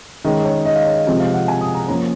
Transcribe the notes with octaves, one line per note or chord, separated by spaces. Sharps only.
D#3 G#3 C#4 D#5
C#5
D#5
F5
C#5
C3 F3 G#3 C4
F5
F#5
G#5
D#6
A#5
F3 A#3 C#4 A#5